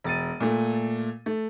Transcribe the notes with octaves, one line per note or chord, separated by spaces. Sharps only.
E1 A6 D#7
A#2 A3
A3